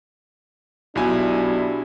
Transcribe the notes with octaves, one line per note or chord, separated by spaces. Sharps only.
B1 B3 D4 E4 F#4 G4 G#5